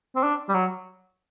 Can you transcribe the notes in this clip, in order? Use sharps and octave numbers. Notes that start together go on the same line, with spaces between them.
C4
D4
G3
F#3